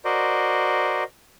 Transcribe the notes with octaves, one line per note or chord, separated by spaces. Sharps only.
F#4 A#4 C5 D5 D#5